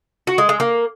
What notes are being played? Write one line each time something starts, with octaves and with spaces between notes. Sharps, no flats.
F#4
G#3
G#3
A#3